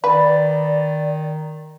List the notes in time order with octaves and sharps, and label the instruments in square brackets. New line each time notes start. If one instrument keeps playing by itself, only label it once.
[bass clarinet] D#3 [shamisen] B4 [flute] D5